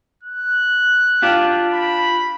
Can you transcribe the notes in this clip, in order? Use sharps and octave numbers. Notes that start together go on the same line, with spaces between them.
F#6
D4 F4 G4
B5